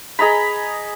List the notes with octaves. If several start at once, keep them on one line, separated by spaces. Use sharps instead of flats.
G#4 D#5 A#5 B5